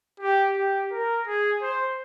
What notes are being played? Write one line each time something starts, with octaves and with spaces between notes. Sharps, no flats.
G4
G4
A#4
G#4
C5